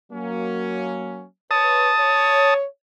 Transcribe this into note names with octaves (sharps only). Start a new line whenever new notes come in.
F#3 A#3 C#4
B4 C#5 A5 D#6
C#5